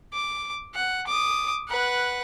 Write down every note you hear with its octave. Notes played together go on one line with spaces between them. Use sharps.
D6
F#5
D6 D#6
B4 F#5